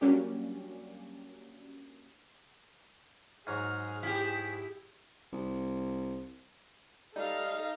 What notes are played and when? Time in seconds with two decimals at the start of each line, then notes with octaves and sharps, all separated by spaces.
0.01 F#3 G3 A#3 C#4 D4 G4
3.47 G#2 F#3 G#4 F6
4.03 E4 G4 B6
5.32 C2
7.16 G3 D#4 A4 F5